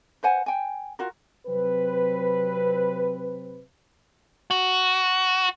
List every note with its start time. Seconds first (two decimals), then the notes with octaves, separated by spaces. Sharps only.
0.23 B4 C5 F#5 G#5
0.46 G5 G#5
0.99 F4 F#4 A#4
1.47 C3 F#3 C4 B4
4.51 F#4